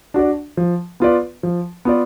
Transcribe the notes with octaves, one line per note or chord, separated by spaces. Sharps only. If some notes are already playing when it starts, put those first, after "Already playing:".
D4 F#4 D5
F3
B3 F4 B4 D5
F3
B3 F4 B4 D5